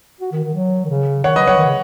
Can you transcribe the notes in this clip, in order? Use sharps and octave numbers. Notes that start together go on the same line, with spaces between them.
F#4
D#3
D#3
F#3
D#3
C#3
D#3 C#5 F#5
F#3 B4 D#5
F#3 C#5 F#5
D#3
C#3